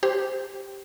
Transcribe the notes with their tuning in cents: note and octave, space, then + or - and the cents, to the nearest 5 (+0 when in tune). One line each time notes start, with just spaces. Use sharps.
G4 +0 C5 +0